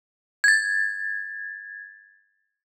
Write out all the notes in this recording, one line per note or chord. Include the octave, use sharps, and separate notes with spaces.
G#6 A6